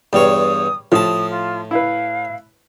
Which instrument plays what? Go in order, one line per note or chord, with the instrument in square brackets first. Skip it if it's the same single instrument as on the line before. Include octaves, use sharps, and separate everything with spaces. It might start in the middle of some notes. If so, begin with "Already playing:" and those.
[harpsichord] E2 G2 C#5 [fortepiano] G3 [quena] D#6
[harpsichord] A2 A5 [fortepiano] F3 [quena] D#6
[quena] F4
[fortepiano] E4 B4 [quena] F5